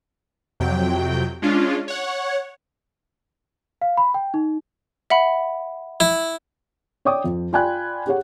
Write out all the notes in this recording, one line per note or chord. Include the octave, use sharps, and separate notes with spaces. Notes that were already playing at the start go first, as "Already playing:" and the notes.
F2 C3 F#3 G5
G#3 C#4 D4 F4
C#5 F#5
F5
B5
G5
D#4
E5 F#5 B5
E4
C#5 D5 G5 D6 D#6
F2
F4 D5 G5 G#5 B5 F#6
G4 G#4 C#5 F#5